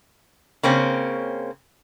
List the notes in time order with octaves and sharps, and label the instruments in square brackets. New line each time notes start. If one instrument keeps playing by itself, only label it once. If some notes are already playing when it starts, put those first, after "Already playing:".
[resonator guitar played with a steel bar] C#3 A#3 C4 C#4